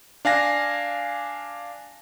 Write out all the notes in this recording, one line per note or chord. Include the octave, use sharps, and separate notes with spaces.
D4 F5 G#5 A#6